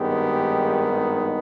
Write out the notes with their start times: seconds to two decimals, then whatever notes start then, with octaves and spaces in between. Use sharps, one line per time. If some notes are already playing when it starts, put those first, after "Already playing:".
Already playing: G#1 G2 D#3 G#3 B3 G4
0.90 D#4